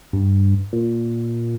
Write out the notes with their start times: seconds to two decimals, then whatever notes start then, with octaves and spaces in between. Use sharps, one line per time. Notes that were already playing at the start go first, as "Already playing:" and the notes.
0.13 G2
0.73 A#2